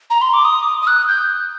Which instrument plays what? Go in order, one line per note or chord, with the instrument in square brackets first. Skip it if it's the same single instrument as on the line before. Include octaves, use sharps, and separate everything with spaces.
[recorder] A#5
C6
D6
D#6
D#6
F#6
G6